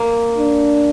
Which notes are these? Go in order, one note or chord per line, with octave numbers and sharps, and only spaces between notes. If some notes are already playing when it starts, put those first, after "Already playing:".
Already playing: A#3
D4